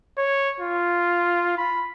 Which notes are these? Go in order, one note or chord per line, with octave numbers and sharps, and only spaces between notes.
C#5
F4
B5